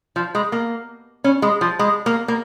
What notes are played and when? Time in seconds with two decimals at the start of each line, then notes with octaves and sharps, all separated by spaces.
0.16 F3
0.35 G#3
0.52 A#3
1.24 C#4
1.42 G#3
1.61 F3
1.79 G#3
2.06 A#3
2.28 A#3